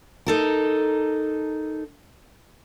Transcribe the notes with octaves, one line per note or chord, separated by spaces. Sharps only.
D#4 A4 A#4